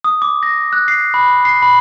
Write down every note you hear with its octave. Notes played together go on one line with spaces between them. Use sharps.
D#6
D6
A#6
F#6
C7
B5
C7
B5